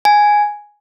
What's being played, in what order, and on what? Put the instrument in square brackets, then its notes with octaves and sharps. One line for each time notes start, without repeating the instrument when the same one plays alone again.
[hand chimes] G#5